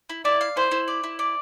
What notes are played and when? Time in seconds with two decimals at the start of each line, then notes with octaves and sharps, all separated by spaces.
0.09 E4
0.25 E4 D5
0.41 F5
0.56 E4 C5
0.71 E4
0.88 D5
1.04 E4
1.19 D5